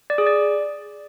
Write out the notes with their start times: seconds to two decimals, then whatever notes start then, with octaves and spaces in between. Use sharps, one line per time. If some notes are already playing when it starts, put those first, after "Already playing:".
0.10 D5
0.18 G#4
0.27 D5